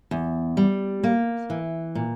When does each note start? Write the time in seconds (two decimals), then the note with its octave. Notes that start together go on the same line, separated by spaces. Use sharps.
0.11 E2
0.57 G3
1.04 A#3
1.50 E3
1.95 A#2